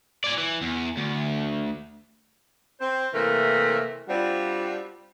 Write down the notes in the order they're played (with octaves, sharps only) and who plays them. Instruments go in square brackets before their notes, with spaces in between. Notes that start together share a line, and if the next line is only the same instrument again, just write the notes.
[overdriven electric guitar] D5 G#5
E3
E2
D2
[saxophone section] C4 C5
C3 E3 A3 A#3 A#4
G3 C4 D4 F4 F#4